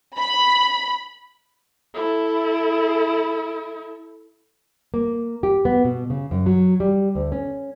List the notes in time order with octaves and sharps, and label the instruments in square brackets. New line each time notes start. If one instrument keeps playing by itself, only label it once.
[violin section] B5
[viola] E4 A4
[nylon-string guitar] A#3
G4
B3
B2
C#3
F#2
F#3
G3
D2
C#4